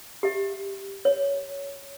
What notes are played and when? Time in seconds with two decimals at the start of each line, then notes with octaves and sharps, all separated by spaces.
0.23 G4 E5
1.05 C#5